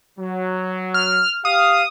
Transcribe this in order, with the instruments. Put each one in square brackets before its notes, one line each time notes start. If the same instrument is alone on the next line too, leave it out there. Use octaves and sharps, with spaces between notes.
[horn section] F#3
[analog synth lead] F6
[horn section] G4 F5 [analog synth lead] D#6